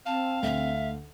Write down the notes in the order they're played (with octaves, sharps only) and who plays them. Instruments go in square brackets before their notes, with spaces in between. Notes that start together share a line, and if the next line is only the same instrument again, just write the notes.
[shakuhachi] C4 [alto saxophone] F5 [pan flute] A5
[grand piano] D2 F7 [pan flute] E5